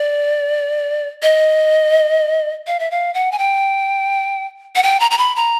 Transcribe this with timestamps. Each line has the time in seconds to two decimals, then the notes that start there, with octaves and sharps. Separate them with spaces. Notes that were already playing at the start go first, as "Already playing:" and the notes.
Already playing: D5
1.23 D#5
2.67 F5
2.79 E5
2.91 F5
3.14 F#5
3.32 G#5
3.38 G5
4.75 F#5
4.83 G5
5.00 A#5
5.11 A#5
5.18 B5
5.36 A#5